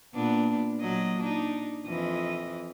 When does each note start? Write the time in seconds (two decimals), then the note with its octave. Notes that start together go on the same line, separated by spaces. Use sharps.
0.14 A#2 B3 D4
0.80 A#2 F#3 D#5
1.20 D4 D#4
1.86 F2 E3 D#5